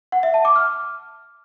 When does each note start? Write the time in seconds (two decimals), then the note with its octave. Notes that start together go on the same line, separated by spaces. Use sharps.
0.12 F#5
0.23 E5
0.34 A5
0.45 D6
0.56 F6